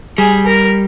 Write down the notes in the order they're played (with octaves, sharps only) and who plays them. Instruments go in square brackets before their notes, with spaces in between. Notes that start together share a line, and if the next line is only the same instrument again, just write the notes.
[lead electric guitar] G3 [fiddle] G#4
[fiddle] A#4